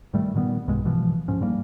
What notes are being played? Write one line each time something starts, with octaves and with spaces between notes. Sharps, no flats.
G#2 D#3 G3 A3
A#2 D#3 G3 B3
B1 G2 B2 G#3
B2 E3 F3
D1 G#2 F3 C#4
G#2 G3 A#3